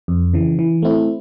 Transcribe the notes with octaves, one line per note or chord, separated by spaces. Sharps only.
F2
C#3 E3
E3
A3 C4 E4